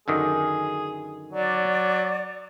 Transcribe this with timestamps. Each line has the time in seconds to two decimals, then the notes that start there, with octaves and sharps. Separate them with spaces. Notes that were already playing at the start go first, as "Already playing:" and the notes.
0.08 F#2 D3 D#3 G#4
1.32 F#3 D5